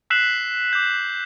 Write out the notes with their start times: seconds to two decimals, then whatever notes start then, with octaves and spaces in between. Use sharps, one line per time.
0.10 E6 F#6 B6 C7 E7 F#7
0.73 D6 G6